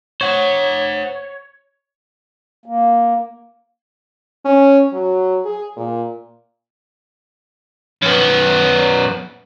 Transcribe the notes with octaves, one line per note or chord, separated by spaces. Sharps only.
C5 C#5 F#5
A#3
C#4
F#3
G#4
A#2
F#2 B3